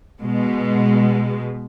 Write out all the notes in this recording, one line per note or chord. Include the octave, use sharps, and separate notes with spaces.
B2 G#3